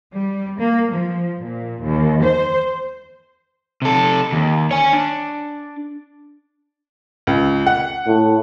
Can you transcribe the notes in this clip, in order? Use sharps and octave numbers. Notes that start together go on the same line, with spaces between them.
G3
A#3
F3
A#2
D#2
C5
C3 A4
D#2
C#5 G#5
D4
C#2
F#5
A2